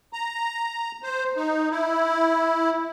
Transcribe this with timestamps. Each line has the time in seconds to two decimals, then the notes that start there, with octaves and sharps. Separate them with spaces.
0.13 A#5
1.03 C5
1.36 D#4
1.71 E4